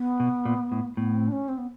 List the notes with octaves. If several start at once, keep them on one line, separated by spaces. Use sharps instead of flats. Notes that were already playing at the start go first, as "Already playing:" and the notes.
Already playing: B3
B2
A#2
A2
A2 B3
C4
D4
C#4
C4
B3